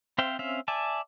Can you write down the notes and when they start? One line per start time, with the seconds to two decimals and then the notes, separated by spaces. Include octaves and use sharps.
0.18 C4 C5 E5 F5 G5
0.39 C4 C#4 E5 F5
0.68 D5 E5 G#5 A5